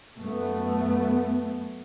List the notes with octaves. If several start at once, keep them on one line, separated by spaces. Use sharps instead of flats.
F#2 A3 B3